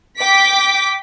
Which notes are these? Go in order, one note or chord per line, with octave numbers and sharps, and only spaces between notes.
G5 D6 B6